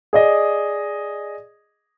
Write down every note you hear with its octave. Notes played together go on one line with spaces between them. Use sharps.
G#4 D5 D#5